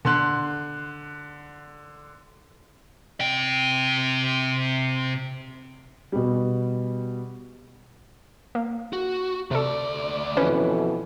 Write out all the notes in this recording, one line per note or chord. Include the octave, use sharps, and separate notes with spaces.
D3 C6 F#6
C3 G5
B2 G3
A#3
F#4
D2 C3 A4 D5
F2 B2 E3 C#4 B4